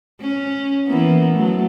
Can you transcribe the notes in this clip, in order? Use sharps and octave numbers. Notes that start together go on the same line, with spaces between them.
C#4
E3 A#3 B3
F#3 A3